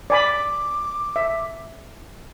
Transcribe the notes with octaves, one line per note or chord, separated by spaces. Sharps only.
D5 G#5 B5 D6
E5